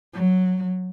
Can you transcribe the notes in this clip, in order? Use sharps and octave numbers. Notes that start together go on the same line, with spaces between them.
F#3